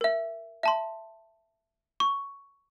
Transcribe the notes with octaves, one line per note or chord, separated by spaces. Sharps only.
A#4 E5
E5 A5 C6
C#6